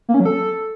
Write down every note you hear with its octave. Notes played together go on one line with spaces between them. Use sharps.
A#3
C#4
F#3
A4